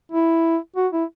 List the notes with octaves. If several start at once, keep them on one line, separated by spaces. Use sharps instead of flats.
E4
F#4
E4